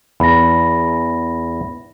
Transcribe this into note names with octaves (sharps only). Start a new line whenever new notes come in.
E2 B5 A#6